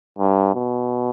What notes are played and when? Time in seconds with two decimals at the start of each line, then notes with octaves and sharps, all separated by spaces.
0.18 G2
0.54 B2